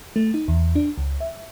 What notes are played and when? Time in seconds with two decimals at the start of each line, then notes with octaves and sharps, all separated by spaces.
0.16 A3
0.34 D#4
0.48 E2
0.75 D4
0.98 C#2
1.20 E5